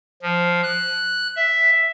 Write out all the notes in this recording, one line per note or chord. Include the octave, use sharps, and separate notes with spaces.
F3
F#6
E5